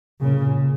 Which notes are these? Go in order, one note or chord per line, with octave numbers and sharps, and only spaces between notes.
A#2 C#3